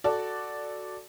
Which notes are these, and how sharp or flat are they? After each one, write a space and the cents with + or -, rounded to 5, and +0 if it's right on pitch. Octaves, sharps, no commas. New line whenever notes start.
F#4 +0 A4 +0 D5 +0